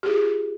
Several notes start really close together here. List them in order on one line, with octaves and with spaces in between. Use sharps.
G4 G#4 F4